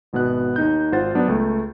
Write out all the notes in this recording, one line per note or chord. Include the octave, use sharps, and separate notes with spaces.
G#1 B2 B3 F#6
D#2 D#4 G6
G#1 F4 C5 F#5 A6
F#3 B3 D4
C#2 A3